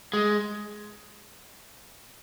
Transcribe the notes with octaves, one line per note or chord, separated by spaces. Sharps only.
G#3